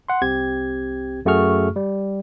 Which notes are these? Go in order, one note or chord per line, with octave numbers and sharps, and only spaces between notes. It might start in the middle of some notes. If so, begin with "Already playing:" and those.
F#5 C6
C2 C4 G4 G#6
F#2 A3 F#4 G#4 C#6 F6
G3